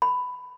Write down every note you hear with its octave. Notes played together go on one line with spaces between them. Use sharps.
B5